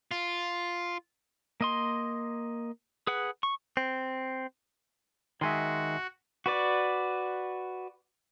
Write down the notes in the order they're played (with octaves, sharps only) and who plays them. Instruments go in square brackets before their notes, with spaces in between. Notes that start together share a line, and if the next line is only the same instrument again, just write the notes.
[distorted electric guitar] F4
[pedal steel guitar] A#3 D#5 C6
G#4 B4 F#5
C#6
[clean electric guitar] C4
[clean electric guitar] D#3 G#3 [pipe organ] F#4 [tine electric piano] E5 G#5 C6
[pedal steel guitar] F#4 B4 D5